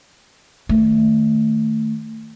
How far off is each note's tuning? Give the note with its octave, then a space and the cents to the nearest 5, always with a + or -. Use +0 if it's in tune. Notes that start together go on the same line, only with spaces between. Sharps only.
D#3 +0 A3 +15